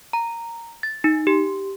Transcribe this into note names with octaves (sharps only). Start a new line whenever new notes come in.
A#5
A6
D#4
G4